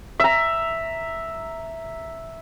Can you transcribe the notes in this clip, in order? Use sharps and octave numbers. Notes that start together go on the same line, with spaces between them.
E5 A#5